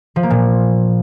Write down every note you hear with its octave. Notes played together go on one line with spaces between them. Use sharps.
F3
A#3
A#2